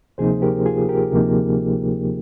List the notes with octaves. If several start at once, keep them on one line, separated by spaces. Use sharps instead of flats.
D2 C3 F3 A#3 D#4 G#4 C5
G4 A#4
F4 G#4
G4 A#4
D2 C3 F3 A#3 D#4